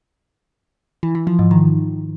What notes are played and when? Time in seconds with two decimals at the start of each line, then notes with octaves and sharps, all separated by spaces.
1.03 E3
1.15 E3
1.27 F3
1.39 G#2
1.51 D#3